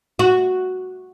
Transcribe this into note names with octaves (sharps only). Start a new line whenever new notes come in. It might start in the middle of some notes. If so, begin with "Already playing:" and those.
F#4